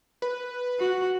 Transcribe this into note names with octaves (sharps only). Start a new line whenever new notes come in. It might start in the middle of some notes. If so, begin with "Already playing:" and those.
B4
F#4